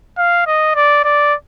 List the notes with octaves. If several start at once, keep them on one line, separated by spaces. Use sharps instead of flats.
F5
D#5
D5
D5